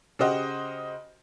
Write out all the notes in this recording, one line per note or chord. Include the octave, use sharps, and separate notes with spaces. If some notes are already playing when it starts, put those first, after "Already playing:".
C#3 F#4 G4 C5 D#5 F#5